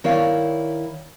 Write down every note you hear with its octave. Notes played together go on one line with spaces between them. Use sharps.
D#3 E4 C#5 D5 F5